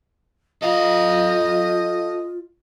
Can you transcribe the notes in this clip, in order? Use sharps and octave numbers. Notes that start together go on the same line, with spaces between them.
F4 A4 D#5 F5